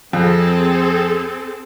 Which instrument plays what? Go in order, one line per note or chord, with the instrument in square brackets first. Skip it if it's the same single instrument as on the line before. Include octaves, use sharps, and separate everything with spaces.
[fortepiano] F2 [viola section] C4 G#4 A4